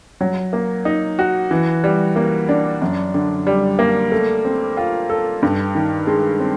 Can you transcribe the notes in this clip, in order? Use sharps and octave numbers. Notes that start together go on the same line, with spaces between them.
F#3
A#3
D#4
F#4
E3
G3
A#3
D4
F#2
D3
G3
A#3
A3
C4
F4
A4
G2
D#3
G#3
C4